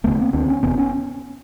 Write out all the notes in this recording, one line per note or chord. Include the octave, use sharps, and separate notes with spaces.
E1 D2 C#3 A3 B3
A#3 C4
D2 D3 C4 D4
B3 C#4
F#1 E2 C3 B3 C#4
B3 C#4